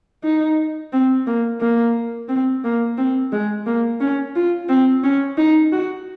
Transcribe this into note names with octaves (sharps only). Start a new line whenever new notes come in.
D#4
C4
A#3
A#3
C4
A#3
C4
G#3
A#3
C#4
F4
C4
C#4
D#4
F#4